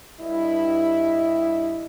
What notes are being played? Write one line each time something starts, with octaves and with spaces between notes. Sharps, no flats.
G2 E4 D#5